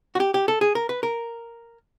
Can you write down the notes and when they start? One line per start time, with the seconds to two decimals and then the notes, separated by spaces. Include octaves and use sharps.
0.15 F#4
0.20 G4
0.34 G4
0.48 A4
0.61 G#4
0.75 A#4
0.89 B4
1.03 A#4